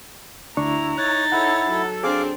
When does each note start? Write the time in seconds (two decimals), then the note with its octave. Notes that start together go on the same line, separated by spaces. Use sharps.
0.57 D2 D4 E4 A#5 C#6
0.98 D#4 C#5 F#6 A6
1.32 E4 A4 C#5 F#5
1.70 F#3 A4
2.03 C4 D4 G#4 F5 D6